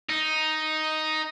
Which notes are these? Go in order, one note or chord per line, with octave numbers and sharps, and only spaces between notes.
D#4